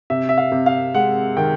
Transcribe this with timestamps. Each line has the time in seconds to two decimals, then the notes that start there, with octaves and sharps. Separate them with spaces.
0.10 C3 E5
0.29 E5
0.38 F5
0.52 C3
0.66 F5
0.95 G#3 F#5
1.37 D#3 G5